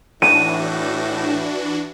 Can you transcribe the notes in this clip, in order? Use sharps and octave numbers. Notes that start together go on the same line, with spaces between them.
A2 E3 D4 F#4 D#7